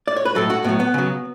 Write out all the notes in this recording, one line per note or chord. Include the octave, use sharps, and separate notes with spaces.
D5
C#5
B4
A2 F#3 A4
F#4
A2 F#3 B3
B3
C#3 F#3